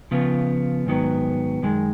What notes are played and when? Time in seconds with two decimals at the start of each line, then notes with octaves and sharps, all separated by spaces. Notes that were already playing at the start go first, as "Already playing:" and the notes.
0.11 C#3 F3 B3 F4
0.86 G#2 D#3 F#3 B3
1.62 F#2 D#3 G#3